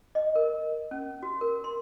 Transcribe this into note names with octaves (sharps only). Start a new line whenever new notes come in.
D#5
A#4
C#4
F#4
A#4
C6